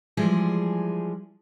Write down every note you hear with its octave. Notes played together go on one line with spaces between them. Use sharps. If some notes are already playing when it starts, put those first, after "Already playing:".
E3 F3 G3 G#3 G#4